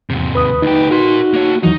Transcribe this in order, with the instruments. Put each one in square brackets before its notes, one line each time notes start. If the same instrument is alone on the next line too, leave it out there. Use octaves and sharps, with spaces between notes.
[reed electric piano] E2 [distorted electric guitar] G#2 C3
[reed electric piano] D#2 D#6 [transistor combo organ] B4
[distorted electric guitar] D2 G4 [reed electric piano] D#4
[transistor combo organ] F#4 [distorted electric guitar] A#4 C6
[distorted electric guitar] A#3 C#5
[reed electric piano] D#2 E3 [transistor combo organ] F#3 [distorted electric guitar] D#4